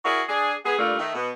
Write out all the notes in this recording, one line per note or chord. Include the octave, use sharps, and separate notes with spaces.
E4 F#4 G#4 A#4 D5
D4 G#4
B3 G#4
G2 A#2 G3 A3 F4
D#3 A3
B2 B3